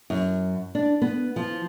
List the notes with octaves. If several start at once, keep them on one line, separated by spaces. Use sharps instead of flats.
F#2
D4
B3
F3